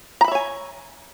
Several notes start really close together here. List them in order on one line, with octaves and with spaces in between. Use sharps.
A#5 B5 E5 C#5 G#5